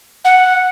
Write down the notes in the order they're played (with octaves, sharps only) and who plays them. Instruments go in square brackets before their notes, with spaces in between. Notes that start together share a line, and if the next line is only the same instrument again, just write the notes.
[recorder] F#5